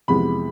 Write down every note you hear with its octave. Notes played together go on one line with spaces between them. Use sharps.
F2 C3 E3 G#3 B3 B5